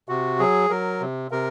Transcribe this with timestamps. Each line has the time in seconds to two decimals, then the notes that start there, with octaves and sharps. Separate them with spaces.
0.09 C3 F#4
0.39 F#3 G#4
0.70 F#3 A#4
1.01 C3
1.31 C3 A#4